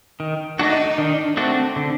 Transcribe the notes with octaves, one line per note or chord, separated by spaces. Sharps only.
D#3
A3 D4 D#4 F#4
D#3 D4
A3 C4 D4 F#4
D3